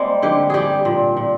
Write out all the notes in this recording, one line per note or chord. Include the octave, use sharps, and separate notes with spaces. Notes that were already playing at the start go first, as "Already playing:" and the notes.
Already playing: G3 G#3 A#3 C4
D3 G4
G3 G4 G#4
A#2
A#2